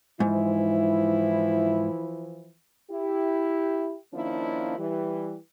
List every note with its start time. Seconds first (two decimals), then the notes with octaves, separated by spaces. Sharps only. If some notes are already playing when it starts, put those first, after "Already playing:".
0.20 G#2 E3 F3 E4
2.91 E4 G4
4.14 D#3 F3 A#3 C#4 D4 E4
4.79 E3 G3